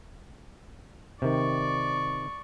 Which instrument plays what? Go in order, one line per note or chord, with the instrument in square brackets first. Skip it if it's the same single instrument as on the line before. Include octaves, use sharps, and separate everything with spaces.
[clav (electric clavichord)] C3 D#3 [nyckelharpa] D5 C#6